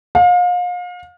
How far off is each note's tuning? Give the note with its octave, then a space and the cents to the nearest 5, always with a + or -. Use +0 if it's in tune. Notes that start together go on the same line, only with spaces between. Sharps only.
F5 +35